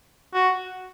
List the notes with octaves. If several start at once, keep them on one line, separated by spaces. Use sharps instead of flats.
F#4